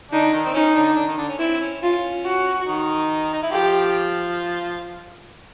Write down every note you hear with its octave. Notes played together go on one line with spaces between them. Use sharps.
D3 D4 D#4
D#3 D#4
C4
C#4 D#4
D3 D4
D#4
D3 D4
D#3 D#4
D3 D4
C#4
C4 E4
C#4
C#4 F4
F#4
D#3 D#4
D#4
E4
F3 F4 G4